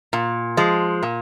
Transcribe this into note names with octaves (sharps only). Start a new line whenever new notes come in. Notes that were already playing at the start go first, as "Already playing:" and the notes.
A#2
F3 G#3
A#2